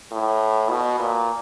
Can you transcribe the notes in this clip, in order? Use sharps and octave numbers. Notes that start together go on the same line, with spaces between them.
A2
B2
A#2